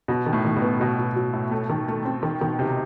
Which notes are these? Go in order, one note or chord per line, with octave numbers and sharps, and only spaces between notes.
B2 F#3
D#3
A2
D#3
B2
B3
B2 F#3
F#3
F#3
A2
A3
D#3
A3
C4
D#3
B2 D#3
C3 D#4